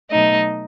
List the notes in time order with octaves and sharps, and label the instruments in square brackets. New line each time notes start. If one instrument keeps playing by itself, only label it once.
[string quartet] B2 F#3 A3 D#4 D#5